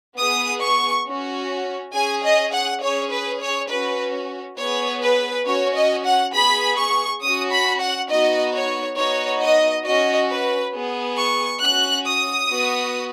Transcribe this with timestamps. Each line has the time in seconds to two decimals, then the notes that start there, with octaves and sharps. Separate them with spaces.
0.18 B3 G#4 D#6
0.62 C#6
1.06 C#4 F#4
1.94 C#4 G#4 G#5
2.24 D#5
2.53 F#5
2.82 C#4 G#4 C#5
3.11 B4
3.41 C#5
3.70 C#4 F#4 B4
4.58 B3 G#4 C#5
5.03 B4
5.46 C#4 F#4 C#5
5.75 D#5
6.05 F#5
6.34 B3 G#4 B5
6.78 C#6
7.22 C#4 F#4 D#6
7.51 B5
7.80 F#5
8.10 B3 D#4 F#4 D#5
8.54 C#5
8.98 B3 D#4 F#4 C#5
9.42 D#5
9.86 C#4 F#4 D#5
10.30 B4
10.74 B3 G#4
11.18 C#6
11.62 C#4 F#4 F#6
12.06 D#6
12.50 B3 F#4